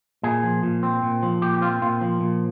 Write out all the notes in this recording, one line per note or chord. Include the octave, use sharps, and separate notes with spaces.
A#2 G#4
F3
A#2
C4
A#2
F3
A#2 G4
G4
C4 F4
A#2 F4
F3
A#2